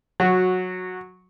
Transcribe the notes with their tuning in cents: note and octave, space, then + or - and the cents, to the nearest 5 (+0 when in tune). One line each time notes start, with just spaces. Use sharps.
F#3 -10 F#4 -5